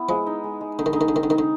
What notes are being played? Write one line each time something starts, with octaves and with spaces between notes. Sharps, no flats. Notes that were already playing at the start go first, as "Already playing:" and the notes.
Already playing: B3 E4
F3 G#3
D#4
G#3
G#3
D3 D#4
D#3
D3 D#4
D#3
D3
D#3 C4
D3
D#3 D#4
D3